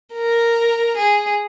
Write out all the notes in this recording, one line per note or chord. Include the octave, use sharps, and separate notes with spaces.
A#4
G#4